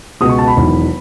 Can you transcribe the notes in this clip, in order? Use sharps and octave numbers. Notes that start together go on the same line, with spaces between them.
C#2 B2 G#3 D#6
C#6
A5
B5
E1 E2 D#3 F#3